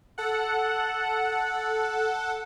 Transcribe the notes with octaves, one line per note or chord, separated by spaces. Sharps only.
A4 F#5